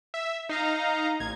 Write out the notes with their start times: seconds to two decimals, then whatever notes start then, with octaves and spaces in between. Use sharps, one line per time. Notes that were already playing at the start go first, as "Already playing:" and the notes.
0.14 E5
0.49 D#4 F5 A#5
1.20 A1 G#6